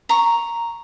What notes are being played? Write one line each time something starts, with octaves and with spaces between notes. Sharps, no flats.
A#5 C#6